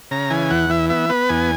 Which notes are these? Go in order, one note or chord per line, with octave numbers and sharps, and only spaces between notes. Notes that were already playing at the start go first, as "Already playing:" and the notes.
C#3 A#5
E3 G#5
E2 F#5
E3 E5
B3 E5
B3 B4
E2 G#5